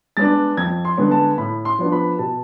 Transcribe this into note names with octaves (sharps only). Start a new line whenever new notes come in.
G#3 B3 D4 A6
F2 G#6
C6
D3 G#3 B3
A5
A2 B5
C6
F3 B3 D4
B5
B2 A5